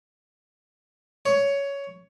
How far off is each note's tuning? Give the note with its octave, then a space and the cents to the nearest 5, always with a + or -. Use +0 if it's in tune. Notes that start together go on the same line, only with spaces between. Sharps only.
C#5 +15